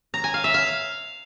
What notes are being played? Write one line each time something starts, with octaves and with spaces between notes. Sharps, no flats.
A#5
G#5
F5
E5
F5